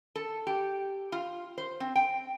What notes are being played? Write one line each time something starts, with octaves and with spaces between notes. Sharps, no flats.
A4
G4
F4
C5
C4
G5